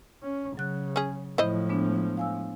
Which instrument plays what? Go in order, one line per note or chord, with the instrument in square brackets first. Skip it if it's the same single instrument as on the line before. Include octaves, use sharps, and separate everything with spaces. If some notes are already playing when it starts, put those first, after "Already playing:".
[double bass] C#4
[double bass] C#3 [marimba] F#3 F#6
[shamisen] C#4 G#4
[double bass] A2 F3 [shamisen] E4 C5 D#5
[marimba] G#3 B3 D4
F5 G#5 E6